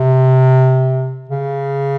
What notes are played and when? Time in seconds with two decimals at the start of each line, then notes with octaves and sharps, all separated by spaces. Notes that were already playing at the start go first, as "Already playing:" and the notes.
Already playing: C3
1.29 C#3